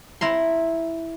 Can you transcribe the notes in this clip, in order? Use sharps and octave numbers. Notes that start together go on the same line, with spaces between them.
E4 A#5 C6